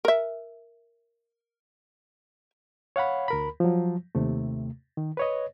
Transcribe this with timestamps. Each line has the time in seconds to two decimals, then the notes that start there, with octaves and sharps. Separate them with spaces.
0.05 A#4 E5
2.96 C#5 F5 F#5 B5
3.28 D2 A#4 B5
3.60 F3 F#3
4.15 D#2 C3 A3
4.97 D#3
5.17 B4 C#5 D#5